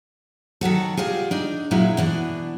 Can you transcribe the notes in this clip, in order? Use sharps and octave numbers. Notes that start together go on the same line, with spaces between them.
D#3 F#3 F#4 A4
G3 F4 G#4
D4 D#4
A#2 F#3 G#3 E4
B2 E3 D4